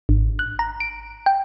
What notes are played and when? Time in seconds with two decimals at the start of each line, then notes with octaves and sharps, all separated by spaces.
0.09 G#1
0.39 F#6
0.59 A#5
0.80 D7
1.26 G5